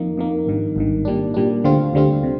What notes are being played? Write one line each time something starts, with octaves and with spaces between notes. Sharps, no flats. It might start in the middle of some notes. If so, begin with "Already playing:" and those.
Already playing: F2 D#3 A#3
F2 D#3 A#3
G#1 G2 D#3
G#1 G2 D#3
A#2 G3 D4
A#2 G3 D4
D2 D3 G3 C4 F4
D2 D3 G3 C4 F4
C3